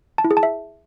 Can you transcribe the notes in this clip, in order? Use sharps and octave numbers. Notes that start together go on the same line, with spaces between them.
A5
E4
G#4
A5
E5